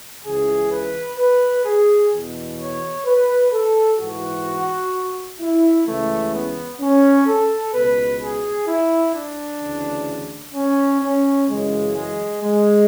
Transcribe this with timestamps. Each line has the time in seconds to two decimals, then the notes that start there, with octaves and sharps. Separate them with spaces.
0.24 C#2 C#3 E3 G#4
0.72 B4
1.18 B4
1.65 G#4
2.11 E2 B2
2.58 C#5
3.06 B4
3.52 A4
3.99 G#2 E3 F#4
5.40 E4
5.87 C#2 C#3 E3 A3
6.33 B3
6.80 C#4
7.27 A4
7.74 C#2 B2 B4
8.21 G#4
8.67 E4
9.14 D4
9.61 D2 C#3 E3
10.55 C#4
11.02 C#4
11.48 F#2 C#3 E3 G#3
11.95 G#3
12.42 G#3